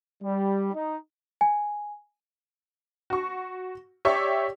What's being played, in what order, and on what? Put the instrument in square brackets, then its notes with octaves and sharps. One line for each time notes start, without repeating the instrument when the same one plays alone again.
[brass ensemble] G3
D#4
[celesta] G#5
[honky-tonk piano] F#4 C#6
G4 C#5 D5 E5 C#6